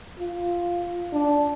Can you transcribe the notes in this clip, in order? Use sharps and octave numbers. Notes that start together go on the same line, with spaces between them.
F4
D4